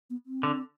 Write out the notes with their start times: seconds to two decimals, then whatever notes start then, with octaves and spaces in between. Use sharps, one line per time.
0.10 B3
0.26 C4
0.43 D3